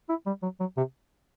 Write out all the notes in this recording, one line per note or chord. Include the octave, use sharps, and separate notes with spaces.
E4
G3
F#3
F#3
C3